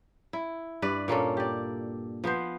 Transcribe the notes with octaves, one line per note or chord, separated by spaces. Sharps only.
E4
G2 B4 D5
A#2 A#3 C#4 A4
G4 D5
F3 B3 B4 C5